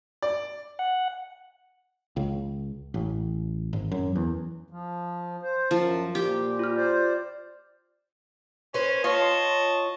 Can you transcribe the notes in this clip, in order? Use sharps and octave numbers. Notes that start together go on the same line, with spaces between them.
D5
F#5
C#2
A1
G#1
F#2
E2
F3
C5
F#2 F3 A5
A#2 G4
F4 F6
C5 D5
C#4 B4 C5
F4 C#5 D#5 A5 C#6